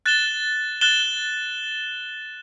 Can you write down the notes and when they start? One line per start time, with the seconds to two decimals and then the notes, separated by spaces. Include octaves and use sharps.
0.06 F#6 A6 E7 G7
0.81 F#6 A6 E7 G7